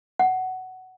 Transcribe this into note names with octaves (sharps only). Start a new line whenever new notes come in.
F#5